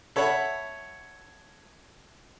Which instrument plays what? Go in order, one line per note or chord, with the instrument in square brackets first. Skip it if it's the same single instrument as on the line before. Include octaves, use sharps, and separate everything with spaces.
[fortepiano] A4 C#5 E5 F#5 B5